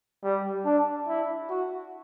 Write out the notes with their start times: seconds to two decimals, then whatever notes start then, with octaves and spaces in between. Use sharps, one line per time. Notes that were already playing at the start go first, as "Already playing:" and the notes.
0.24 G3
0.65 D4
1.08 E4
1.50 F#4